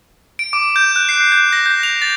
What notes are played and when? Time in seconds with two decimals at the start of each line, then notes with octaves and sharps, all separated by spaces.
0.39 D7
0.53 D6
0.76 G6
0.96 F#6
1.09 C7
1.32 G6
1.53 A#6
1.66 G6
1.83 F7
2.02 A6